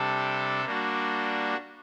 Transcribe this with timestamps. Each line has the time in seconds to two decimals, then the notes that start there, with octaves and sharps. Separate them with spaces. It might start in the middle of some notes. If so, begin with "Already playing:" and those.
Already playing: C3 G3 D4 A4
0.65 G3 A#3 D4 F#4